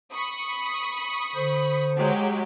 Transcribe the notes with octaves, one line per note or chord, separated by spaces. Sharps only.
B5 C#6 D#6
D3 C5
F#3 G#3 G4